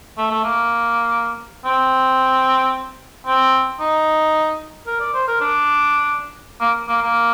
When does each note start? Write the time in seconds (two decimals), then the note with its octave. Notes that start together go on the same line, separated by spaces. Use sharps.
0.18 A3
0.31 A3
0.44 A#3
1.65 C4
3.27 C4
3.80 D#4
4.87 A#4
5.00 D5
5.14 C5
5.28 A#4
5.41 D4
6.61 A#3
6.88 A#3
7.02 A#3